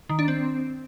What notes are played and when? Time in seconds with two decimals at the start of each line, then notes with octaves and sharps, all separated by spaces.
0.09 D#3
0.19 D4
0.28 C4